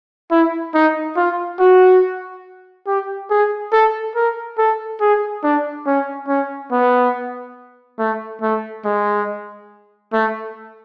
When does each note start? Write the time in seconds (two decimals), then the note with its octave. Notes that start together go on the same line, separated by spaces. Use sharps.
0.31 E4
0.74 D#4
1.16 F4
1.59 F#4
2.87 G4
3.30 G#4
3.72 A4
4.15 A#4
4.58 A4
5.00 G#4
5.43 D4
5.86 C#4
6.28 C#4
6.72 B3
7.99 A3
8.41 A3
8.85 G#3
10.13 A3